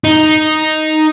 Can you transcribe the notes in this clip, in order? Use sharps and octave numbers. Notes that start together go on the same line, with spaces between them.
D#4